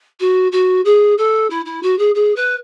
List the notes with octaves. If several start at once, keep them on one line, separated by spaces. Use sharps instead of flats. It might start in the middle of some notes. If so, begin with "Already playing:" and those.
F#4
F#4
G#4
A4
E4
E4
F#4
G#4
G#4
B4